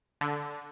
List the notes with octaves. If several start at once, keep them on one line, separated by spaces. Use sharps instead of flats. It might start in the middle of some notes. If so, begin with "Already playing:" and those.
D3